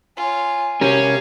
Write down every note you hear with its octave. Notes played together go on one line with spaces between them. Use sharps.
F4 C#5 G#5
C3 C#4 G4 A#4 C#5 F5